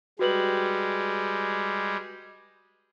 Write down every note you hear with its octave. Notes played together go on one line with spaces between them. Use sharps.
G3 G#3 F#4 B4 F#7